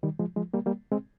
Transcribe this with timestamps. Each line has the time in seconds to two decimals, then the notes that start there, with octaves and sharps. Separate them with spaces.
0.03 D#3 G3
0.19 F3 G#3
0.36 F3 G#3
0.53 G3 A#3
0.66 G3 A#3
0.92 G#3 C4